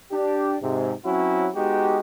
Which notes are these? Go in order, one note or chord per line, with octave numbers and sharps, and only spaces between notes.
D4 G4
G#2 C3
F#3 C4 C#4 E4 F#4
G#3 B3 D#4 F#4 G4